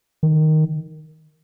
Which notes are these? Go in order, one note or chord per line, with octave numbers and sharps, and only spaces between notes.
D#3